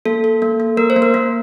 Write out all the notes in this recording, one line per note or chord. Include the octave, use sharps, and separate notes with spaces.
A#3 A4
A4
A#3
A#3
A#3 A#4
C5
A#3
A#4
A#3